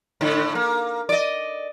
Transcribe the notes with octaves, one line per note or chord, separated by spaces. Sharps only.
A2 D3
A#3
D5 D#5